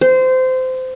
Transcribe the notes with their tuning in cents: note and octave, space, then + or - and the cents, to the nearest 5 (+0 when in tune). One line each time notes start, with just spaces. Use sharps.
C5 -20